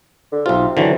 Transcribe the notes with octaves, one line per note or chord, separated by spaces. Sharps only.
D3
B1 C3 F4
D3 E3 F#3